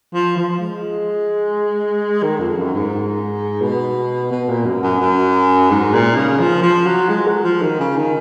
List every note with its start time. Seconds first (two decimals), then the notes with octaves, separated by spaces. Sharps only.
0.14 F3
0.36 F3
0.60 G#3
2.22 D#3
2.40 F2
2.57 F#2
2.74 G#2
3.61 B2
4.31 B2
4.49 A#2
4.66 F#2
4.83 F#2
5.00 F#2
5.71 G#2
5.94 A#2
6.16 C#3
6.40 F3
6.63 F3
6.86 F#3
7.09 G#3
7.27 F#3
7.44 F3
7.62 D#3
7.79 C#3
7.97 D#3